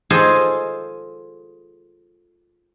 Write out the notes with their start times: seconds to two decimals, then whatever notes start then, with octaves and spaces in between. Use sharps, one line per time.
0.10 F4 G#4 A4 C5 D#5